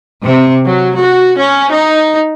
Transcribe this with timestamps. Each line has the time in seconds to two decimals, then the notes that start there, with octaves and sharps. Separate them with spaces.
0.24 C3
0.67 F#3
0.99 F#4
1.37 C#4
1.72 D#4